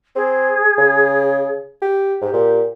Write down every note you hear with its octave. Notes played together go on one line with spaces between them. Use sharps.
C4 G#4
C#3
G4
G#2 G4
A#2